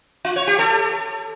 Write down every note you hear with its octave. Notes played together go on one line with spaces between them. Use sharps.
F4
C#5
G4
A4